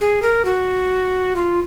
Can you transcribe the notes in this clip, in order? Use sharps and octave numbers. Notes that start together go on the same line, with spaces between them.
G#4
A#4
F#4
F4